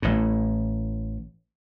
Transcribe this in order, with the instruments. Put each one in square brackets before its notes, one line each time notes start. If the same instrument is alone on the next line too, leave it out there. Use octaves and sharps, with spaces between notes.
[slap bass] A1 A2